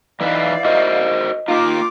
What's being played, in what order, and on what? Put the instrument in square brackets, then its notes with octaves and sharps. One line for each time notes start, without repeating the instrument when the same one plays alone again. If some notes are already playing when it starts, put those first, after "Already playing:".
[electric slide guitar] E3 D#4 B4 [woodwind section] E4 D5 F5
[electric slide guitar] F#4 A#4 C5 [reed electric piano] D#5
[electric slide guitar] A#3 D#4 [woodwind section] F4 D6